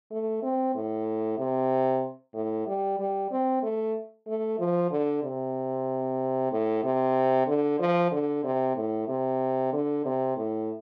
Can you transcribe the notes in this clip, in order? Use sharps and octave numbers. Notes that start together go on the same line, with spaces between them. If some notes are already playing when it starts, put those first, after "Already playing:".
A3
C4
A2
C3
A2
G3
G3
C4
A3
A3
F3
D3
C3
A2
C3
D3
F3
D3
C3
A2
C3
D3
C3
A2